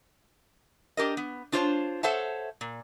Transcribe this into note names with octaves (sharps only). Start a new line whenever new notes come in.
D4 G4 A#4 D#5
B3
D4 F4 A#4 C5 C#5 A5
A4 C5 C#5 E5 F#5 A5
A#2